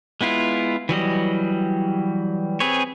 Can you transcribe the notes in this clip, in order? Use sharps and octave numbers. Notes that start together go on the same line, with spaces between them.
G#3 B3 E4 F4
E3 F#3 G3 D#5
C4 G#4 B4 C#5